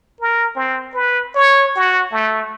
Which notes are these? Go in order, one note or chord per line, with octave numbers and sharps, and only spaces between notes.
A#4
C4
B4
C#5
F#4
A3